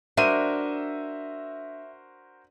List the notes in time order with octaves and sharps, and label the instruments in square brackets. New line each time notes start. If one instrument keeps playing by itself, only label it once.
[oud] D4 [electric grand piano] F#4 A#4 C5 [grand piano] E5 D#7